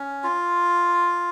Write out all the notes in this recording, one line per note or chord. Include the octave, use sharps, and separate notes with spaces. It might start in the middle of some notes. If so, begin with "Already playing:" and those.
Already playing: C#4
F4